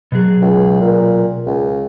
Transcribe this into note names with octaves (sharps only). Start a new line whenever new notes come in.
B2 F#3 G#4
C#2
A#2
C#2